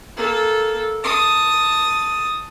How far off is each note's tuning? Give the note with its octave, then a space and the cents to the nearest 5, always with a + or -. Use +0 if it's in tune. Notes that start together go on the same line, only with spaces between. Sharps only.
A#3 +0 A4 -15
A5 +5 D#6 +5